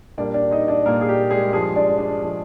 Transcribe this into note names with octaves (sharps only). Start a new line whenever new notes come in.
A#2 G3 A#3 D4 D5
D4 D5
D#4 D#5
D4 D5
A#2 G3 A#3 A#4
G#4
G4
G#3 G#4
G2 F3 G#3 G#4
D4 D5
D4 D5
F3 G#3